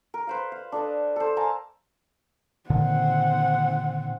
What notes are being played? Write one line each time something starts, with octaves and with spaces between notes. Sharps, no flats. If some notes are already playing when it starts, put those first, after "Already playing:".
A#4
B4 C5 F5
F5
D4 A4 D#5
A4 C5
A#4 F5 G#5 A5
A#2 D3 D#3 C4 F#5